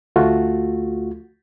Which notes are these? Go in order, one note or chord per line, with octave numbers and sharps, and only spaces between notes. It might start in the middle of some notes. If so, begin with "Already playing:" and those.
D2 A3 F4 F#4